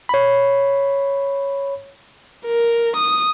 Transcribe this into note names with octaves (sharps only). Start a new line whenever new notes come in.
C#5 B5
A#4
D#6